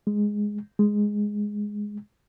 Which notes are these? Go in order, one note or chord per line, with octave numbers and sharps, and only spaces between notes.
G#3
G#3